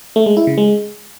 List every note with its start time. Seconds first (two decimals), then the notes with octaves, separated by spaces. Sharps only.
0.16 A3
0.26 G#3
0.37 E4
0.47 C#3
0.58 G#3